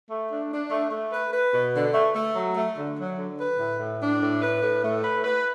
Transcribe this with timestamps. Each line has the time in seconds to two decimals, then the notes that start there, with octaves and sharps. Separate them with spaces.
0.09 A3
0.29 D4
0.51 D4
0.71 A3
0.91 A3
1.11 B4
1.32 B4
1.54 B2
1.74 D3
1.94 A3
2.15 A3
2.36 F#3
2.56 A3
2.77 D3
2.98 F#3
3.18 D3
3.39 B4
3.59 A2
3.80 A2
4.01 D4
4.21 A2
4.42 B4
4.62 A2
4.83 A3
5.04 B4
5.24 B4